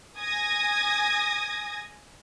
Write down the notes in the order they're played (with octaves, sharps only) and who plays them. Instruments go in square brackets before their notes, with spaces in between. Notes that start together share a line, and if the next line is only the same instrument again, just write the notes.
[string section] G#5 D#6 G#6 A#6